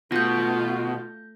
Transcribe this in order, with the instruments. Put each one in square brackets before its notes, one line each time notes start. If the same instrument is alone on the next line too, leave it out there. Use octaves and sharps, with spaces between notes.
[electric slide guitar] B2 [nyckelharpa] A3 [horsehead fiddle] F4 [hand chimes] G6 A#6